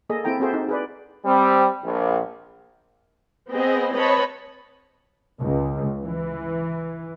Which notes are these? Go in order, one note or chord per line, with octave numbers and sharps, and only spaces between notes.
A#3 G#4 A4 D#5
C4 E4 A4 G5 A#5
C4 F#4 G#4 A4 C5 E5
D#4
G#4 B4 D5
G3 C4
A#1
B3 C4 G#4 D#5
C4 B4 C#5 D#5 A5 B5
C#2
E3